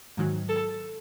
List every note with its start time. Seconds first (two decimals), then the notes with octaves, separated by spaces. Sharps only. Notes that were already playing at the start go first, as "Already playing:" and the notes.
0.17 G#2 D#3 F#3
0.49 A4